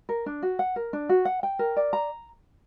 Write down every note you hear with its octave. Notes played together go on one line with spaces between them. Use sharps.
A#4
D4
F#4
F#5
A#4
D4
F#4
F#5
G5
A#4
D5
A#5